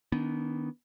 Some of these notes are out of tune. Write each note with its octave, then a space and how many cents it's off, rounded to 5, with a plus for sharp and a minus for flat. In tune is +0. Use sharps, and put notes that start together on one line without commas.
D#3 +0 B3 +0 D4 -35